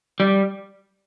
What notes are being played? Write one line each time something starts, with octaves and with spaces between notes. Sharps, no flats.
G3